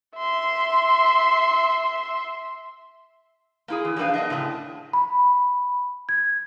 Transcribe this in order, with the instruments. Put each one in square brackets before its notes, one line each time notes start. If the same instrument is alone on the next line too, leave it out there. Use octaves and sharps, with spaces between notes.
[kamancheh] E5 C6
[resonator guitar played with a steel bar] A#3 E4 G#4
E3
F3 G3 A#3 D4 B4 F5
B3 D4 D#5 E5
A2 C#3 B4 A5
[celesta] B5
G#6